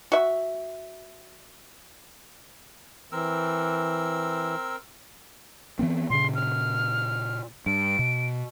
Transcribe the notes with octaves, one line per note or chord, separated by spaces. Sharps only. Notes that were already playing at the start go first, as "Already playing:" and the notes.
F#4 E5
E3 C4 A#4 E6
E3 B3 C4
A#2 C#3 C6
F6
G2 D7
B2